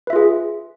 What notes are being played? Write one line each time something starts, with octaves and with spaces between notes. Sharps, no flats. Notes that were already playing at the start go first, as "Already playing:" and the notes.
F4 G#4 B4 E5